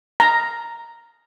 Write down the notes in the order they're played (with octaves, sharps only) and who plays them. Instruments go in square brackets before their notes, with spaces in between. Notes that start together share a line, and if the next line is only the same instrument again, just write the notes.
[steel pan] A#5